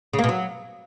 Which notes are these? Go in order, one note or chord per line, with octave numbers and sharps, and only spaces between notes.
C#3
A#3
B2
F#3